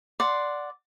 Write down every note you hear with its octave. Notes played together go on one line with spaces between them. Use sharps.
D5 F#5 C6